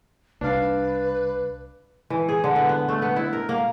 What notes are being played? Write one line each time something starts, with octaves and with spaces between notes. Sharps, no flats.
C2 D4 B4 F5
E3
G#4
D3
B3
B3
A3
B3
E4
A#4
A#3